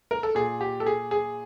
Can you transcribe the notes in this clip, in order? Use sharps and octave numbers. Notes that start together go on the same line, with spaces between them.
A#4
A4
A#2 G#4
G4
A4
G#4
G#4